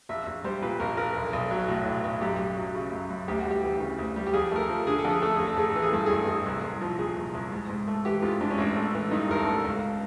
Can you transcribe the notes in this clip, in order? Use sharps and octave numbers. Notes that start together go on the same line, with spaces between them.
A#1 E5
A#1
G3 C5
A#2 B4
A#1 A#4
A#1 A#4
B1
B1
F#3
A2
B1
B1
F#2 G4
F#2
F#3
C#3
F#2
F#2
D2 G4
F#4
G3
G4
E3
C#3
D2
G3
G4
F2 G#4
A3 A#4
A4
F3
D3 G#4
A4
F2
G#4
A3 A4
G#4
A1
A4
A1 G#4
A4
E3
G#4
G2 A4
A1 G#4
A4
A1 G#4
C2
C2
F3
A#2 G#4
C2
C2
G#2
G#2
A3
E3 G4
G#2 F4
G#2 D4
C#4
A1 D4
A3
E3
G2 D#4
A1 A#4
A4
A3
C#2